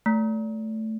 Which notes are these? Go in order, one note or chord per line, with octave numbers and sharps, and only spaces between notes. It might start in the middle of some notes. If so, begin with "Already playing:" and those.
A3